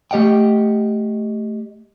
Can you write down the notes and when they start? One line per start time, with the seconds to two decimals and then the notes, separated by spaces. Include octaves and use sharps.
0.11 A3 G4 D#5 F#5 G5